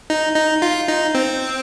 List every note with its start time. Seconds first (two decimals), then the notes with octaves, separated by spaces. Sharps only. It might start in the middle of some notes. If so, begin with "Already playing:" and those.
0.10 D#4
0.36 D#4
0.62 F4
0.88 D#4
1.15 C4